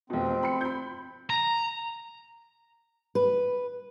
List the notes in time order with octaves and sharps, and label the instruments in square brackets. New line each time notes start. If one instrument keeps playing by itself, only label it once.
[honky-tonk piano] F1 B2 [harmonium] C4
[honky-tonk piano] B5 C#7
B5 G6
[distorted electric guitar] A#5
[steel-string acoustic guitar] B4